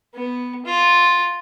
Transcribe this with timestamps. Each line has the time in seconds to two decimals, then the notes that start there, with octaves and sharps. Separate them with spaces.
0.15 B3
0.65 F4